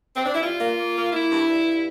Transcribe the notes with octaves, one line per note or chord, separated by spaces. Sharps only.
C4
D4
E4
G2 F4
A#3
A#3
A#3
A#3 E4
G2
G2
G2